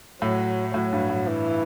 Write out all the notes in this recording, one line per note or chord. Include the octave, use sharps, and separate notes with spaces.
A2 F#3
A2 F#3
G2
A2
E3